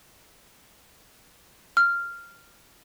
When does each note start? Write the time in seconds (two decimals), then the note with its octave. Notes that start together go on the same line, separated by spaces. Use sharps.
1.77 F6